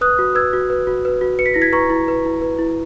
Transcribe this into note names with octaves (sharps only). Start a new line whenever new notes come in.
B4 D#6 F#6
F#4
B4 E6 G#6
F#4
B4
F#4
B4
F#4
B4 C#7
B6
E4 A#6
G#6 B6
B4 A#5 C#6
E4
B4
E4
B4
E4